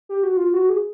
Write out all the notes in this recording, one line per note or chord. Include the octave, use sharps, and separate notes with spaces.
G4
F#4
F4
F#4
G#4